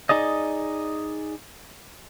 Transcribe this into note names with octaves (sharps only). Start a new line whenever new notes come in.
D#4 G#4 D5 D#5